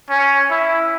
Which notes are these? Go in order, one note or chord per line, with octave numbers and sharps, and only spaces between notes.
C#4
E4